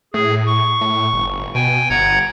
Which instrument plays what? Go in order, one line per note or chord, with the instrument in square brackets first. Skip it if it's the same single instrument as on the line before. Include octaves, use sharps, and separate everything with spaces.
[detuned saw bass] A2 [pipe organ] G#4
[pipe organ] C#6
[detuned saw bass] A2
G1
[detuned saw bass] B2 [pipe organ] G5 G#5
[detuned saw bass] G1 [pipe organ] F#5 A#5 G#6